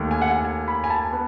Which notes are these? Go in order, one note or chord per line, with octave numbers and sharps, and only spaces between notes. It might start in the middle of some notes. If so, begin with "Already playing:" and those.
Already playing: D#2 D#3 A3
G#5
F#5
G#5
G#5
B5
G#5
A5
B3